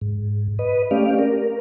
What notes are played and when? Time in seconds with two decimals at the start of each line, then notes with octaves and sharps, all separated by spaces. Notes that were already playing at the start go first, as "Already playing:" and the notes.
0.01 G#2
0.59 B4 D#5
0.91 A3 C#4 G4 D5 F5
1.19 A#4